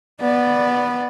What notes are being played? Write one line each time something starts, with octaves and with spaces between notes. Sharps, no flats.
B3 D5